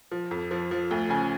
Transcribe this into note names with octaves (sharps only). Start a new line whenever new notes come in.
F3
F2
F3
F3
D2
C#3 G#5